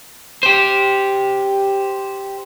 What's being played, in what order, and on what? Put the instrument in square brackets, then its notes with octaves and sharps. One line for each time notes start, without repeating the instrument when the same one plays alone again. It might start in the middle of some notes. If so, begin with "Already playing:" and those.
[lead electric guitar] G4 C5